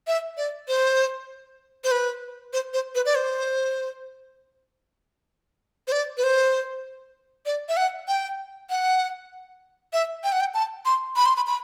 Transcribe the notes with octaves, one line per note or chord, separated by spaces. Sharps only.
E5
D5
C5
C5
B4
C5
C5
B4
D5
C5
C5
D5
B4
C5
D5
E5
F#5
G5
F#5
E5
G5
F#5
G5
A5
C6
B5
C6
B5
B5